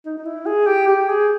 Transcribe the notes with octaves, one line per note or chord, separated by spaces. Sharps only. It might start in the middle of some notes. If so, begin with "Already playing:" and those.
D#4
D#4
E4
G#4
G4
G4
G#4